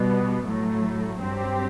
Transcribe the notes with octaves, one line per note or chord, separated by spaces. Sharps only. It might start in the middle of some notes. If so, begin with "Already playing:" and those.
Already playing: B2 G3 B3
A2 F#3 A3
G2 F#3 C4 G4